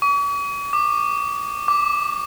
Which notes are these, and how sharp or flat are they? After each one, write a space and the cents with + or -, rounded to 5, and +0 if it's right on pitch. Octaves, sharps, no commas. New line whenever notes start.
C#6 +45
D6 +30
D6 -10